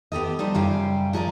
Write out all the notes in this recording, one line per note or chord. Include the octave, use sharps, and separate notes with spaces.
B3 G4 A4 D#5
F3 G3 D#4 C5
F#2 C#3 G3 F5 G5 G#5
F3 G#4 A#4 C#5 D5